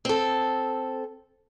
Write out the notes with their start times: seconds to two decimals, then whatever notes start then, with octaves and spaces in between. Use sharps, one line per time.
0.05 C4 A4